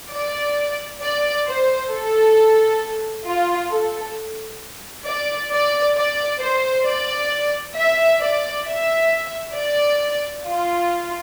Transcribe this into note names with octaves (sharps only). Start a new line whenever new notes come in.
D5
D5
C5
A4
F4
A4
D5
D5
D5
C5
D5
E5
D5
E5
D5
F4